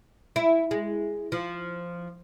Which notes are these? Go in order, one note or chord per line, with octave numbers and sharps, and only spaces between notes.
E4
G#3
F3